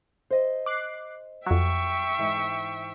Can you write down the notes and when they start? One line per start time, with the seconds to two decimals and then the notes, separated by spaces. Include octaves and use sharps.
0.30 C5 D#5
0.66 D6 F#6 C7
1.47 F2 F#3 E5 G5 C#6
2.18 G#2 E3